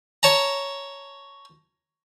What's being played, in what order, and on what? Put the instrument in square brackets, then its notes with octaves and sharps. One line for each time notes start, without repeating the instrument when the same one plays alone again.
[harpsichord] C#5 A5 A#5